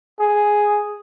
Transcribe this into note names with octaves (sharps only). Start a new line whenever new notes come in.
G#4